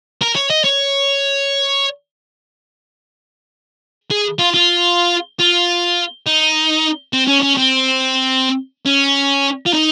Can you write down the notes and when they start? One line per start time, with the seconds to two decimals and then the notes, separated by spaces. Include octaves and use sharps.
0.22 A#4
0.35 C#5
0.50 D#5
0.64 C#5
4.11 G#4
4.39 F4
4.54 F4
5.40 F4
6.26 D#4
7.13 C4
7.27 C#4
7.42 C#4
7.57 C4
8.86 C#4
9.66 F4
9.73 D#4